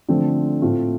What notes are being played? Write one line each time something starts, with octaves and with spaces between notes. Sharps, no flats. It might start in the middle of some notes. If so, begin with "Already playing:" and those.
D3 F3 A3 C4
A2 A3 C4 F4